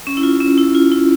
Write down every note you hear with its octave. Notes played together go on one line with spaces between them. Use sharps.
C#4
E4
F4
C#4
E4
F4
E4